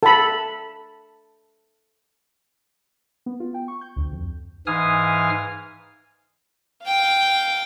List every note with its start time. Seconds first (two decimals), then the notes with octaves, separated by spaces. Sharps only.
0.03 A4 B5
3.26 B3
3.40 F4
3.54 G5
3.68 C#6
3.81 G6
3.96 D2
4.13 F2
4.67 G#2 E3 F5 G#5 D#6 F6
6.85 F5 G5